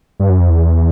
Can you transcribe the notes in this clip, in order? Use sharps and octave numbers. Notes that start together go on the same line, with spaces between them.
G2
F#2
F2
E2